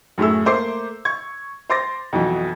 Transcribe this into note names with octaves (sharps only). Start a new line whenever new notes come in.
F#2 A2 A3 G#4 E6
A3 A#3 C5 D6 C7
C#6 G#6
C5 C6 D6 A6 A#6
F2 B2 E3 F#3